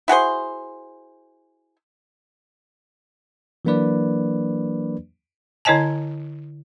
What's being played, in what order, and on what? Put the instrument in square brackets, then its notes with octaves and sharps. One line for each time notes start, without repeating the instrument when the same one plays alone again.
[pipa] E4 F#4 G#4 C5
[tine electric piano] E3 F#3 A#3 D4 B4 D5
[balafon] D3 E4 C#5 D#5 G#5 A5